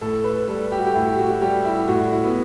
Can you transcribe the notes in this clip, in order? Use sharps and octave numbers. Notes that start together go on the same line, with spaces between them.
A2 A4
B4
G3 A4
G4
F#4
G4
A2 E4
F#4
G3 G4
E4
A2 F#4
E4
B3